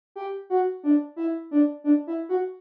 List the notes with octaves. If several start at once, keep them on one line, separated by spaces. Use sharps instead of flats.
G4
F#4
D4
E4
D4
D4
E4
F#4